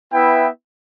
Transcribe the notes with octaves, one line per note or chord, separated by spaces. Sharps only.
B3 E4 B4 E5 G5